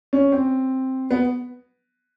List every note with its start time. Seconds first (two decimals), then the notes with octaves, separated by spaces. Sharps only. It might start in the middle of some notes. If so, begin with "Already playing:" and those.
0.13 C#4
0.32 C4
1.11 B3